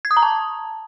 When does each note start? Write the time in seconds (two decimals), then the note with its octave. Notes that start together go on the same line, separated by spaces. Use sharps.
0.05 G#6
0.11 D#6
0.17 A#5
0.23 A5